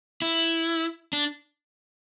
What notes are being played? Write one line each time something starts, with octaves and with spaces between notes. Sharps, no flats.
E4
D4